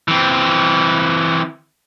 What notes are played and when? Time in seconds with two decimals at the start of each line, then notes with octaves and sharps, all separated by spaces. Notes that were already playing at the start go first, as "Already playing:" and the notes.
0.08 E3 C4